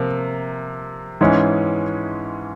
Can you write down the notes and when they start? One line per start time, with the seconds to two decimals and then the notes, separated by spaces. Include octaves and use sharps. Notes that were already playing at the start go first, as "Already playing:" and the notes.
Already playing: C3 F3 A#3
1.21 G#2 E3 G#3 C#4